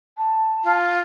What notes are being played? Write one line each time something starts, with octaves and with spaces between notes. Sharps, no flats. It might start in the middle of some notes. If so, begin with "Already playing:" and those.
A5
F4